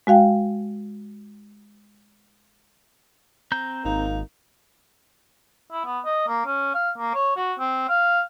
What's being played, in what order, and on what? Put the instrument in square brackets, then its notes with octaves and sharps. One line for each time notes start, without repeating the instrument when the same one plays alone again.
[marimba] G#3 F#4 F5 G5
[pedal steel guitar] C4 A#5 G6
[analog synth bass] G#1 [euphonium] A#3 [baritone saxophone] D#4
[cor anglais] E4
B3
D#5
A#3
C#4
F5
A#3
C#5
F#4
C4
F5